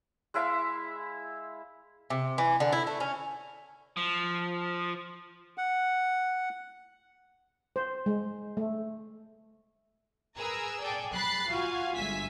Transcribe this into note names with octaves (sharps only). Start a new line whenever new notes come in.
G#3 E4 E5 F5
C3
E3
D3
E4
A3
C#4
F3
F#5
C5
G#3
A3
G#4 A#4 B4 A#5 E6
G#4 A4 D5 G5
B5 F#6 A6 C7
F4 F#4 F5 G#5
G1 G#3 E5 G#5 B6